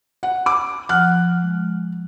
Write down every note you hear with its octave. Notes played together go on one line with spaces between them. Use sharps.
F#5
D6
F3 F#5 F6 F#6
G#3